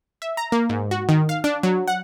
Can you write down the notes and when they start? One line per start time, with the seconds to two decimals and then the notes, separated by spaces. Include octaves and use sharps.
0.22 E5
0.37 A#5
0.52 A#3
0.69 G#2
0.91 F#4
1.09 D#3
1.29 F5
1.44 D4
1.63 F#3
1.88 F#5